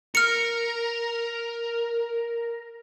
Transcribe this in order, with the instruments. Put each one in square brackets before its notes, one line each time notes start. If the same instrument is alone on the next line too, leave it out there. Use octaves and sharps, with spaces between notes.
[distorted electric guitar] A#4 [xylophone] F6 C#7